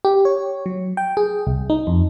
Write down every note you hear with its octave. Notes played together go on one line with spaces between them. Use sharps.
G4
C#5
F#3
G5
G#4
C2
D#4
F2